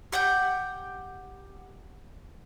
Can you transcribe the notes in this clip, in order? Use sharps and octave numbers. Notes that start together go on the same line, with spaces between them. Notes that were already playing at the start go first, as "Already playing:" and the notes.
G4 F#5 G5 G6